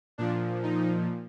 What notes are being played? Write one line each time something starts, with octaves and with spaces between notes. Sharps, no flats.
A#2 F3 D4
D#4